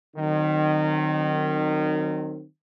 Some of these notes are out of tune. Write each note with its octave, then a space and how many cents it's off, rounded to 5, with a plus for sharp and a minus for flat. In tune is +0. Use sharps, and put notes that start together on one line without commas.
D#3 -25 F#3 +5 C4 +0